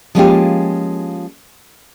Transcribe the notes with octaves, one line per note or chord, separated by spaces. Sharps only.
F3 G#3 A#3 C#4 F4 G4